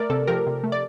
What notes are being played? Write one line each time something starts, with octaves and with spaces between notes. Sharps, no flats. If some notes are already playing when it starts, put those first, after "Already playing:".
Already playing: A3 A#4 D5
C3 A4
F3 G4 A#4
C3
A3
D5